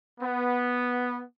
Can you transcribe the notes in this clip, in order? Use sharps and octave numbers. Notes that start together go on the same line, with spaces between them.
B3